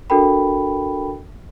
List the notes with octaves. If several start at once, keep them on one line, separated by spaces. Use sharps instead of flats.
D4 F#4 A4 A#4 G5 B5